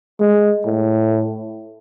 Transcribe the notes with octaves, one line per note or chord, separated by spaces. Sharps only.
G#3
A2